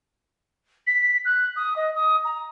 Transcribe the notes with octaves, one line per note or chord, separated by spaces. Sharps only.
B6
F#6
D#6
D#5
D#6
A#5